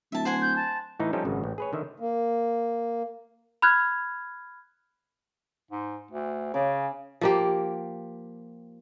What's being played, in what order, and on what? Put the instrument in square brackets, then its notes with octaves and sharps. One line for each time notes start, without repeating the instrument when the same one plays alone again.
[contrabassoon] D1 [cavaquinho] E5 A5
[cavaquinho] C5 F#5 G#5
[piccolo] G6
A5
[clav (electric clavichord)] A2 E3 D#4
F3 G3 C#4 D#4 G4 A4
G#1 F#2 C#3
A1
G#4 B4 C#5
D3 D#3 E5
[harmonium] A#3
[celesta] B5 F6 F#6 G#6
[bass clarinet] G#2
D2
[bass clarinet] C#3 [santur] C#4 D6
[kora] F3 A#3 G4